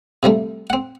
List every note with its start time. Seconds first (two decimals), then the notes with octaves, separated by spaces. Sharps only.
0.23 C3 F3 G3 A3
0.70 C4 F#5